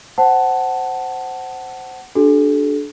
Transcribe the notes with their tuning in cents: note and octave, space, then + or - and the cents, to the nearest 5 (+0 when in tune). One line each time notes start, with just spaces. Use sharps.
C5 +0 F#5 +20 A5 +0
D4 +0 F#4 +35 A4 -40